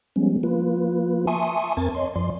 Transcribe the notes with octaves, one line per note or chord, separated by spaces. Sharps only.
F3 G3 G#3 B3 C#4
F3 A#3 F4 B4
E5 G#5 A5 C6 C#6 D#6
F2 C4 A#4 G#6 A6
C#5 D#5 C6
F#2 F3 D5 C6